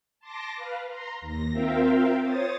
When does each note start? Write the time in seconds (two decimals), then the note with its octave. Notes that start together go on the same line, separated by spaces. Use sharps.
0.20 A5 C6 D6 A#6
0.55 B4 F5
0.88 A#5 C6
1.21 D#2 A#6
1.51 C4 F4 A#4 E5 F5 G5
2.24 C5 C#5 D#6 A6